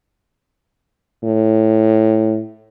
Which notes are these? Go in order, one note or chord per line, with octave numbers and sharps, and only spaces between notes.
A2